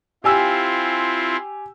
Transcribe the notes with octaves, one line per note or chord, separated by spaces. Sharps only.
C4 E4 F4 G4 G#5 E6